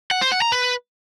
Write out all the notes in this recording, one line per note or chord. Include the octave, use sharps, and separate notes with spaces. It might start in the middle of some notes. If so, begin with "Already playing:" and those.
F#5
C5
F#5
A#5
B4